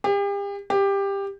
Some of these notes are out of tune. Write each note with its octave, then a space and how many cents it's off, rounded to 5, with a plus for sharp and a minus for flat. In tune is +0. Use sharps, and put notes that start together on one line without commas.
G4 +40
G4 +15